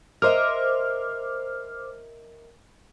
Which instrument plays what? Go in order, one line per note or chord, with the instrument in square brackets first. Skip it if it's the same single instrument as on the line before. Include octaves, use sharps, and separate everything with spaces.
[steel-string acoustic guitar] A#4 D#5 E5 [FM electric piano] C5 D6 F6